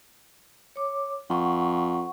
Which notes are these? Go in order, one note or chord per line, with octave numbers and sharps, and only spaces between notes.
C#5 D6
F2 F#5 C#6